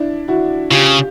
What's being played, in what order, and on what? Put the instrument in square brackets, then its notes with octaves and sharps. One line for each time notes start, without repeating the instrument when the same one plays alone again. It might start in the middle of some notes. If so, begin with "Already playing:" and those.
Already playing: [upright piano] D4 E4
E4 F#4
[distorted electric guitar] C#3 [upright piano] F4 G4